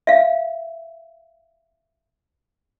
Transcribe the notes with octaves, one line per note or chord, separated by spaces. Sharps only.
E5 F5